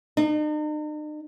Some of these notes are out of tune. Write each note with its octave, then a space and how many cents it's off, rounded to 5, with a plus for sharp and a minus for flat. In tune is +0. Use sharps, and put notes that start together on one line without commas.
D#4 -45